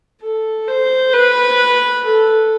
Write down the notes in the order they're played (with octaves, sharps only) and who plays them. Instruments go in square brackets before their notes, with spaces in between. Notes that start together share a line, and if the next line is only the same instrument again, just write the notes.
[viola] A4
C5
B4
A4